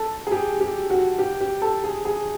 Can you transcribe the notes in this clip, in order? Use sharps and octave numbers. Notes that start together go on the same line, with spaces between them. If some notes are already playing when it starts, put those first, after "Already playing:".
Already playing: A4
G#4
G4
G4
F#4
G4
G4
A4
G#4
G#4